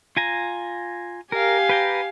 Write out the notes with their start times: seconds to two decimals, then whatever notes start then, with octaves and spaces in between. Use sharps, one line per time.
0.17 F4 G#5 A#5
1.32 G4 A#4 F5 G#5
1.69 B4 G5 A#5